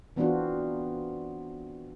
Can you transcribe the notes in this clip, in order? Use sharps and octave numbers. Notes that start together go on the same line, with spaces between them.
E3 B3 C4 D4 F4 F#4